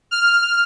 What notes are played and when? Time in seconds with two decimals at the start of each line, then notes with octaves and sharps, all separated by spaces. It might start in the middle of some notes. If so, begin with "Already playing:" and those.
0.11 F6